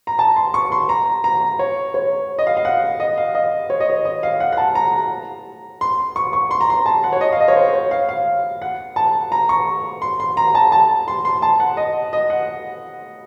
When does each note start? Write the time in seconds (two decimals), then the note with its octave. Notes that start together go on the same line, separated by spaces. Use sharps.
0.07 A#5
0.19 A5
0.36 C6
0.54 C#6
0.72 C6
0.89 A#5
1.24 A#5
1.59 C#5
1.94 C#5
2.39 D#5
2.47 F5
2.57 F5
2.65 F#5
3.00 D#5
3.18 F5
3.35 D#5
3.70 C#5
3.80 D#5
3.90 C#5
4.05 D#5
4.23 F5
4.40 F#5
4.52 F#5
4.57 A5
4.75 A#5
5.81 C6
6.16 C#6
6.33 C#6
6.51 C6
6.61 A#5
6.70 C6
6.86 A5
7.04 F#5
7.12 C#5
7.21 D#5
7.32 F5
7.40 D#5
7.48 C#5
7.56 C5
7.74 C#5
7.91 F5
8.09 F5
8.62 F#5
8.96 A5
9.32 A#5
9.49 C#6
10.02 C6
10.20 C6
10.37 A#5
10.55 A5
10.72 A5
11.08 C6
11.25 C6
11.42 A5
11.60 F#5
11.77 D#5
12.13 D#5
12.30 F#5